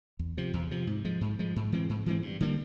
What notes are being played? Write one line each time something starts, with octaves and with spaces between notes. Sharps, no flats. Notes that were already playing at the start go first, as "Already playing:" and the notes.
E2
C3 F3
E2
C3 F3
G#2
F3 G#3
G#2
F3 G#3
G#2
E3 G#3 C4
G#2
E3 G#3 C4
G2
D3 G3 A#3